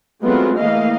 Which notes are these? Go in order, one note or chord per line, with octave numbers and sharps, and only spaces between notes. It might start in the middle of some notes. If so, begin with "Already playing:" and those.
F#3 G#3 A3 B3 C4 F4
E3 A3 A#3 D#5 F5